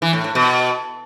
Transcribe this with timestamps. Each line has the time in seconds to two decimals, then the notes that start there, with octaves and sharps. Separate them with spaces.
0.02 E3
0.13 A2
0.24 A2
0.35 B2